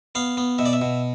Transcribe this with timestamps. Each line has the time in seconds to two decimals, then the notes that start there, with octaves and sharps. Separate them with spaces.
0.15 B3 F5
0.37 B3
0.58 B2 E5
0.66 D5
0.73 E5
0.81 B2